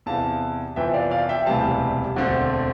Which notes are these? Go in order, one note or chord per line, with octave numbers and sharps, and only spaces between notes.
E2 C3 E3 F5 A5
F2 C3 E3 B3 E5 G5
D5 F5
D5 F5
E5 G5
E1 D2 C3 E3 G3 F5 A5
E1 D2 D3 A3 C4